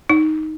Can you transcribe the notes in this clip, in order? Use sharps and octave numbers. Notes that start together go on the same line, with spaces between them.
D#4